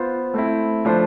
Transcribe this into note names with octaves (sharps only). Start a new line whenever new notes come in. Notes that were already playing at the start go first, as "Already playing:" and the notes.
Already playing: B3 F4 C5
A3 C4 E4
F3 A3 D4 F4 C5